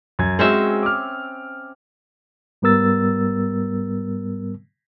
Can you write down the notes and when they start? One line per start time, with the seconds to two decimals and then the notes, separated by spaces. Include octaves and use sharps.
0.19 F#2 G#6
0.39 G#3 C4 C#4 F#4 G#4 E5
0.83 D6 F6
2.62 G#2 G3 B3 A#4 E6 A6